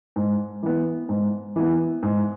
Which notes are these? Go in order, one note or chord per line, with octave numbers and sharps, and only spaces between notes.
G#2
E3 B3
G#2
E3 B3
G#2